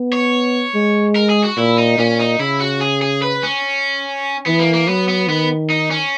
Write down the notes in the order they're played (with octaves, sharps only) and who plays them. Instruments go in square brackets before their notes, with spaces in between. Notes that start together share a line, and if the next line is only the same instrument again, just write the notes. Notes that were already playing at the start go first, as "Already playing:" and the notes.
Already playing: [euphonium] B3
[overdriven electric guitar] C#5
[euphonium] G#3
[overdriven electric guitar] A#4
G#4
F#4
[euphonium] A#2 [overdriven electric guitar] E4
[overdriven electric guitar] D#4
[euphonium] A#2 [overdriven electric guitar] C#4
[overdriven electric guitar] D#4
[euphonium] C#3 [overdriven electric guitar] E4
[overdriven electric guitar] F#4
G#4
G#4
B4
C#4
[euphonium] E3 [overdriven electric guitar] B3
[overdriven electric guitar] A#3
A#3
[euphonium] F#3 [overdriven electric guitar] B3
[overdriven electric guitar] B3
[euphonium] D#3 [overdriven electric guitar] B3
[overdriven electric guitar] D#4
C#4